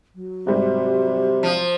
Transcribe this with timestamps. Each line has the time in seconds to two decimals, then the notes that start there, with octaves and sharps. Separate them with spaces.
0.15 F#3
0.47 G#2 C3 G3
1.43 F3